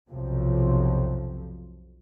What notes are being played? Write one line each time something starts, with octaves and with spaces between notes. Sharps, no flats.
B1 F2 C3 F3